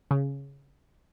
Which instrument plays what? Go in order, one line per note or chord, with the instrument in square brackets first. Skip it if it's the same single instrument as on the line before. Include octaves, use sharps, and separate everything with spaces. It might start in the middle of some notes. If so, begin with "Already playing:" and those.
[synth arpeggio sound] C#3